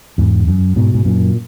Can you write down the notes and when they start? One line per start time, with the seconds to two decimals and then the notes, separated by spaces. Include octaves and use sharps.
0.18 E2 G#2
0.47 F#2
0.76 G#2 B2
0.94 G#2
1.05 F#2 A#2